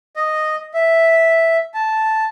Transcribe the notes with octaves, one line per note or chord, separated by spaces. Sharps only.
D#5
E5
A5